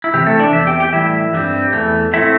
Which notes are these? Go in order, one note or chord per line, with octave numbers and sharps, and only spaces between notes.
E4
C3 E3 C4 G4
A3 A4
D4 D5
E2 E3 C4 E5
G4 G5
G4 G5
A2 E3 G3 E4 E5
G2 G3 C4
E2 E3 A3
A2 A3 C4 E4 E5